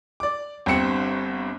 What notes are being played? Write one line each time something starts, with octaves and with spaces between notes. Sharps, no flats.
D5 D6
G1 G2 C4 C#7